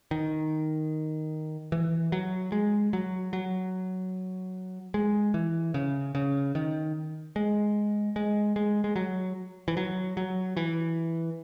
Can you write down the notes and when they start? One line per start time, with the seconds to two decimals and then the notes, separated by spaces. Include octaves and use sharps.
0.11 D#3
1.72 E3
2.12 F#3
2.52 G#3
2.93 F#3
3.33 F#3
4.94 G#3
5.34 E3
5.74 C#3
6.15 C#3
6.55 D#3
7.36 G#3
8.16 G#3
8.56 G#3
8.84 G#3
8.96 F#3
9.68 E3
9.77 F#3
10.17 F#3
10.57 E3